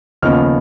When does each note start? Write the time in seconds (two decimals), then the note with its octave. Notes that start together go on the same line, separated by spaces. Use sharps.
0.22 D#2 C#3 F3 B3 D#4 F6